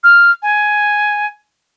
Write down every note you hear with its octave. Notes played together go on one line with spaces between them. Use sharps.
F6
G#5